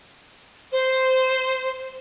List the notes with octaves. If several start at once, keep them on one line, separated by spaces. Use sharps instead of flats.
C5